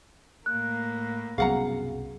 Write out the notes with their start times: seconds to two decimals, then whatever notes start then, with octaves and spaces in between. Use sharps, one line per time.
0.46 A2 A#3 F#6
1.38 C2 F#2 B2 G#4 F5 F#5 A#5